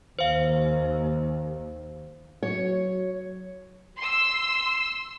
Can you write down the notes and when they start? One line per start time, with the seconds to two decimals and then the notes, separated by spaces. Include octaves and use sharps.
0.19 D#2 C5 F5
2.43 F#3 C#5
3.98 C6 E6